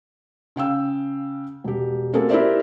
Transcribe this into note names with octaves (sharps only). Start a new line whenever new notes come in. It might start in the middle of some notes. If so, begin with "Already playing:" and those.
C#3 F5 G5 E6
E1 G4
A3 A#3 C4 F#4 G#4 A4
E4 G4 A#4 C5 D5 E5